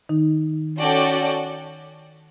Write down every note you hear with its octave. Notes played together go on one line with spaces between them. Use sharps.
D#3 D#4
C#4 F#4 A4 D5 G5